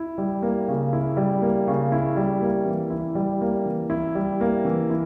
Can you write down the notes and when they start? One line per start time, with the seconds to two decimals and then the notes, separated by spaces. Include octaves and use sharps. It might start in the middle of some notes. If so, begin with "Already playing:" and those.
Already playing: E4
0.18 G3
0.42 A#3
0.68 C#3
0.93 E4
1.17 G3
1.42 A#3
1.67 C#3
1.92 E4
2.16 G3
2.41 A#3
2.66 E3
2.90 E4
3.15 G3
3.41 A#3
3.66 E3
3.90 E4
4.15 G3
4.41 A#3
4.65 E3
4.90 E4